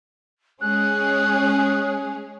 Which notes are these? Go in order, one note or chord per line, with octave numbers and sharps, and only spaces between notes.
G#3 C#4 G#4 F#6